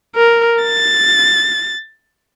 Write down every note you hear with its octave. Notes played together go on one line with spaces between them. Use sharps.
A#4
A6